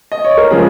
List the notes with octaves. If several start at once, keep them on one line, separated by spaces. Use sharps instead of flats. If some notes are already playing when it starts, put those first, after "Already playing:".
D#5
C#5
A#4
C#3 F3 G#3 G#4